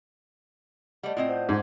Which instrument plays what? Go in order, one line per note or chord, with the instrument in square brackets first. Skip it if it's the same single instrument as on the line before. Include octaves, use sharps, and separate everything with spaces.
[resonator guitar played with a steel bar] G3 A3 [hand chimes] D5 D#5 F#5
[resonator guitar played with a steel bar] A2 C4 D#5 [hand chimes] F4
[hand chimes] C5 F#5 G6
[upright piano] G#2 [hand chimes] D6 G#6